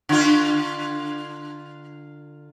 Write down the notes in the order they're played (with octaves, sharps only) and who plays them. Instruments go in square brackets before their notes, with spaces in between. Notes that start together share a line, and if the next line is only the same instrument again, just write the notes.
[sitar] D3 F4